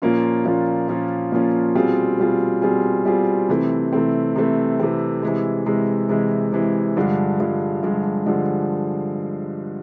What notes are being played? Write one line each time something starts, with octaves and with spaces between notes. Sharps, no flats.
A#2 F3 A#3 C#4 F4
A#2 F3 A#3 C#4 F4
A#2 F3 A#3 C#4 F4
A#2 F3 A#3 C#4 F4
B2 G3 C4 F4 G#4
B2 G3 C4 F4 G#4
B2 G3 C4 F4 G#4
B2 G3 C4 F4 G#4
C3 E3 A3 C4
C3 E3 A3 C4
C3 E3 A3 C4
C3 E3 A3 C4
C3 E3 G#3
C3 E3 G#3
C3 E3 G#3
C3 E3 G#3
G2 D3 F3 G#3
G2 D3 F3 G#3
G2 D3 F3 G#3
G2 D3 F3 G#3